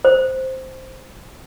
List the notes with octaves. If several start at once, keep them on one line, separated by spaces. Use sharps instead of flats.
C5